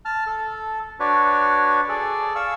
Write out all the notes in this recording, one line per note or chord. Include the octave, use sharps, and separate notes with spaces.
A5 F6
A4
D4 F#4 B4 C#5 D5
G#4 A4 D5
F5 C#6 E6